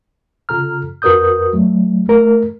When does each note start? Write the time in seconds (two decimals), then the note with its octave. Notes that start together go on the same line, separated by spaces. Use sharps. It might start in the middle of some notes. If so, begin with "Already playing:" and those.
0.49 C#3 F4 A4 A#5 F6
1.02 F2 F#4 A#4 B4 D#6 G6
1.53 F#3 A3
2.09 A3 A#4